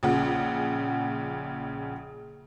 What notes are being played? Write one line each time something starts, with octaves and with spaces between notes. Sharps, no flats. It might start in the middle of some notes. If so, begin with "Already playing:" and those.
A#1 C#3 F#5